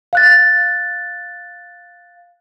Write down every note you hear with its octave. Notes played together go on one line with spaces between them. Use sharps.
F5 F#6 A6